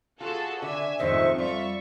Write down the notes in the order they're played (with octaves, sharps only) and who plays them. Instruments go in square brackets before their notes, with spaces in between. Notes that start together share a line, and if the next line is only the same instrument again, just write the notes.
[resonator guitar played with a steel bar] F4 [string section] F#4 G#4 A4
[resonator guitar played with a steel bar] D3 [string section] E5 G#5
[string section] F2 C#6 [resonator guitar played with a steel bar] A#2 D#3 G#3 [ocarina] C5 [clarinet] E5
[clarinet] G3 [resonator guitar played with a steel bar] F4 [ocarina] D5 [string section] E5 C#6